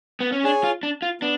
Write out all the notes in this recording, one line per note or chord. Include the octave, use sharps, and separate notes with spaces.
B3
C#4
D4 G#4 C#5 G#5
F4
D4
F4
B3 D4